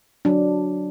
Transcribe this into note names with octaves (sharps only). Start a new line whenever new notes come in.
F#3 D4